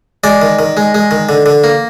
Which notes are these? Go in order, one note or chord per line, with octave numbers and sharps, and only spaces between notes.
G#3 D5
D#3
D#3
G#3
G#3
D#3
D3
D3
A#3